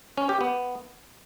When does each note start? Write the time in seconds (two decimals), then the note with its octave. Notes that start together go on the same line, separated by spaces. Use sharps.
0.17 C#4
0.29 G4
0.41 B3